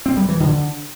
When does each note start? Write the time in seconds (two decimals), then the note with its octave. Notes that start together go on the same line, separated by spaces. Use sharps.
0.06 C4
0.17 G3
0.29 E3
0.40 D3